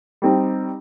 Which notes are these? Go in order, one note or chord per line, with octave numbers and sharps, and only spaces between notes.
G3 C4 D#4